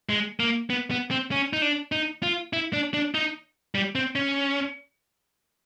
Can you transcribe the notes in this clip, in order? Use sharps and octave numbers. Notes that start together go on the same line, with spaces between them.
G#3
A#3
B3
B3
C4
C#4
D#4
D4
D#4
F4
E4
D4
D4
D#4
G3
C4
C#4